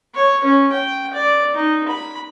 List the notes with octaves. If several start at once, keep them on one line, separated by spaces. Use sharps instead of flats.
C#5
C#4
G5
D5
D#4
B5